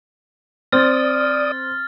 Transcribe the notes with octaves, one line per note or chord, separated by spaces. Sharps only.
C4 D5 D#6 F6 A6